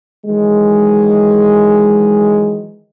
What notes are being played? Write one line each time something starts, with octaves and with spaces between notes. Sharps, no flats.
D#3 E3 F#3 G#3